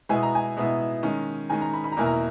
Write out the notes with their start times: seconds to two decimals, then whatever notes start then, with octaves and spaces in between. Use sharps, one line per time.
0.09 B2 G#3 B3 E4 G#5
0.23 A#5
0.35 G#5
0.57 B2 G#3 B3 E4
1.03 D#3 G#3 C#4
1.50 D#3 G#3 C#4 G#5
1.61 A#5
1.74 B5
1.84 B5
1.92 A#5
1.97 E2 B2 A#3 E4 G#5
2.06 A#5